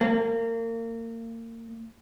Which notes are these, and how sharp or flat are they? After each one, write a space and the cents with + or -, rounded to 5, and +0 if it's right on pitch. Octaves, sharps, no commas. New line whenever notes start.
A#3 -30